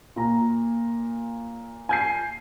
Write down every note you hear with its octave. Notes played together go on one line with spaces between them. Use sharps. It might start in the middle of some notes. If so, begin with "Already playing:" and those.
A#2 A#5
G#5 G6 C7